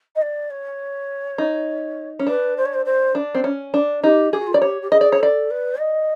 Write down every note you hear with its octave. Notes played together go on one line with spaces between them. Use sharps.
D#5
D5
C#5
D#4
C#4
D4 B4
C5
C#5
C5
C5
D4
C4
C#4
D4
D#4 G4
G4 G#4
F#4
F4
F#4 D5
G4 C#5
G4
G#4 D#5
D5
C#5
A4 D5
B4
D#5